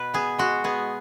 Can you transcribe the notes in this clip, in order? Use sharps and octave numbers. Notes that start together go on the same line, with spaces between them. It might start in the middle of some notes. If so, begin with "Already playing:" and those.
Already playing: B2 B4
B3 G#4
G#3 F#4
B3 G#4